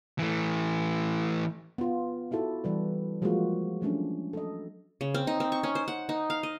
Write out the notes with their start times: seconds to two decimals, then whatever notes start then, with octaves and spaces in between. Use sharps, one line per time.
0.19 E3 A3
1.78 B3 F4
2.31 D#4 E4 F#4 A4
2.64 E3 G3 B4
3.22 F3 G#3 A#3 F4 F#4
3.81 E3 F#3 A3 C#4 D4
4.33 A4 D#5
5.01 C#3
5.14 C4
5.27 D#4
5.40 C4
5.52 C#6
5.63 C#4
5.75 C5
5.88 F#5
6.09 D#4
6.30 F5
6.43 D#5